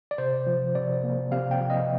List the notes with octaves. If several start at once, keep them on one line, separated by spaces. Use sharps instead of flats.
D5
C3 C5
F3
C3 D5
A#3
C3 F5
G5
F3
D#5